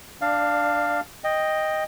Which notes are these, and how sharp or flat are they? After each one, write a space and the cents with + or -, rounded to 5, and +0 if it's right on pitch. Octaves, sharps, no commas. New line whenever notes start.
D4 +5 D5 +25 F5 +0
D#5 +0 G5 +10